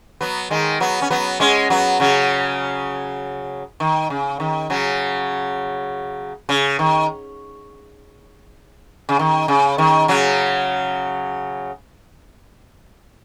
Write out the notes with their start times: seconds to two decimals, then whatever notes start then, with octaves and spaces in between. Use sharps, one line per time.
0.21 F#3 B3
0.50 D#3 G#3
0.80 F#3 B3
1.02 C#4
1.10 F#3 B3
1.40 G#3 C#4
1.70 F#3 B3
2.00 C#3 F#3
3.80 D#3
4.10 C#3
4.40 D#3
4.70 C#3 F#3
6.49 C#3
6.79 D#3
9.09 C#3
9.19 D#3
9.48 C#3
9.78 D#3
10.08 C#3 F#3